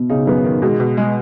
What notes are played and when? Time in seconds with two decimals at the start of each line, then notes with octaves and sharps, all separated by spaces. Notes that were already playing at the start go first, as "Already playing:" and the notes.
Already playing: B2
0.10 C#3 D#4
0.27 F#2 B3
0.44 D#3
0.62 B2 G#3
0.80 B2
0.97 G#3